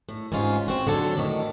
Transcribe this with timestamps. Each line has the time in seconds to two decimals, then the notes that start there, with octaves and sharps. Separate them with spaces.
0.09 A2
0.32 G#2 C3 G#3 C#4 F4
0.68 C4 F#4
0.87 D3 F#3 A4
1.17 A2 D#3